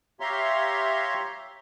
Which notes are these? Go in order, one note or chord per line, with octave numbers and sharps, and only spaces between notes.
G4 C#5 E5 F5 A#5 C6